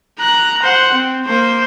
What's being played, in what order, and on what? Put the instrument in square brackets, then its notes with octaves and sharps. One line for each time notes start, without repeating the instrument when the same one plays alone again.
[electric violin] A#5 F#6
C5 F#5
C4
A#3 C5